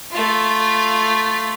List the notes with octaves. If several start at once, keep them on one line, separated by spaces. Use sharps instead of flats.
A3 F4